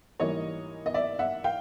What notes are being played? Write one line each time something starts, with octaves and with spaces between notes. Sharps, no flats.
G#2 E3 G3 A#3 C#5 D#5
D#5
D5 E5
E5 F#5
F5 G5